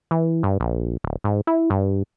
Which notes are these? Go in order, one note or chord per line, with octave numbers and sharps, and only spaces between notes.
E3
G2
A#1
D1
G#2
E4
G2